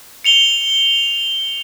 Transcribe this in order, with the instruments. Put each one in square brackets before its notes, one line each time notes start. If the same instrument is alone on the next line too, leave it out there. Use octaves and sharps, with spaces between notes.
[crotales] C#7 F7 G7